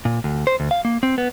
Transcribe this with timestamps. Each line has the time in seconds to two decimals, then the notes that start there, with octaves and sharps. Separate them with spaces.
0.05 A#2
0.24 D2
0.47 C5
0.60 D2
0.71 F5
0.85 A#3
1.03 C4
1.18 B3